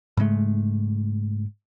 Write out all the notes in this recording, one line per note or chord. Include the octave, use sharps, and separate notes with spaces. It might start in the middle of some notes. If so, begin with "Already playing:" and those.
G#2 C#3 G#3 A3